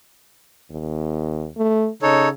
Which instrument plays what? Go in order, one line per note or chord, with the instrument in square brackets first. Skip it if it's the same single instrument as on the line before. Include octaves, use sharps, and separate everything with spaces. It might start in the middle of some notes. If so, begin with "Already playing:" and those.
[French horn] D#2
A3
[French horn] C#3 [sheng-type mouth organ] D#4 A4 C#5